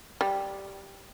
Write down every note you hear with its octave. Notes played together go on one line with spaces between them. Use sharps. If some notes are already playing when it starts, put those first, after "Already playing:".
G3